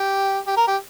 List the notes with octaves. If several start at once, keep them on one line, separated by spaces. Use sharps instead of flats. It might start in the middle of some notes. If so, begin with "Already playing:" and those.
Already playing: G4
G4
A#4
G4